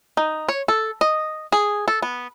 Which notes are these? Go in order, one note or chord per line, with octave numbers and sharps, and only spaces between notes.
D#4
C#5
A4
D#5
G#4
A4
B3